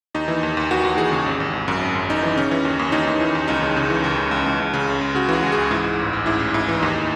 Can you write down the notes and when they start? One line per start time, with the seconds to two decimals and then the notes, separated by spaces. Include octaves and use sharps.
0.15 D#2 D#4
0.28 E3
0.43 D#2
0.57 D#2
0.71 D#2 F#4
0.85 D#2
0.98 E3 G#4
1.11 C#3
1.26 G#1
1.40 G#1
1.53 G#1
1.68 F#2
1.81 G#1
1.95 F#2
2.10 G#1 D#4
2.23 E3
2.37 C#3 C#4
2.51 E3
2.65 D#2
2.79 D#2
2.92 D#2 D#4
3.07 D#2
3.20 E3
3.35 D#2
3.48 C#2 D#4
3.62 C#3
3.77 C#3
3.90 E3
4.04 C#2
4.17 C#3
4.31 C#2
4.46 C#2
4.60 C#2
4.74 C#3
4.88 C#2
5.01 C#2
5.15 C#3 F#4
5.29 E3 G#4
5.42 C#2
5.52 G#4
5.57 C#2
5.71 G#2 E4
5.84 G#2
5.99 A1
6.13 A1
6.26 G#2 E4
6.40 A1
6.54 G#2 E4
6.68 E3
6.81 D#2 D#4